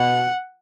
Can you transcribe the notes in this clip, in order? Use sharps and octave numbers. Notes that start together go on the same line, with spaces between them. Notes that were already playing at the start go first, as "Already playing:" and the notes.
Already playing: B2 F#5